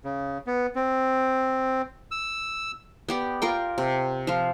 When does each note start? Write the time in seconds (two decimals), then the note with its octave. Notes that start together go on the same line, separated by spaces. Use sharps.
0.04 C#3
0.47 B3
0.75 C4
2.11 E6
3.09 B3 G4 D5
3.42 F4 A#4 G5
3.78 C3
4.27 F3 F4